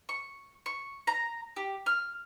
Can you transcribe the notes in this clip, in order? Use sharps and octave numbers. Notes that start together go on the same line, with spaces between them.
C#6
C#6
A#5
G4
F6